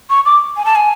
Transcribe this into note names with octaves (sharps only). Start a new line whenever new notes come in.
C#6
D6
G#5
A5
G#5